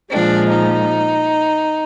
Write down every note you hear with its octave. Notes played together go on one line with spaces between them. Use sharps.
A#2 F3 G#3 D4
D#4